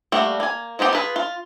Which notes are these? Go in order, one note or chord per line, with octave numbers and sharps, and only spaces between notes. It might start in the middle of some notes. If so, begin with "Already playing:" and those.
G3 A3 A#3 F#4
A#3 G#5
F3 B3 D#4 G4
F4 G#4 B4
F4